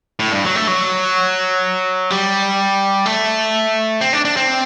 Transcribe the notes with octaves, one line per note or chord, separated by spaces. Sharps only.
A2
G2
F#3
A3
F#3
G3
A3
C4
D4
D4
C4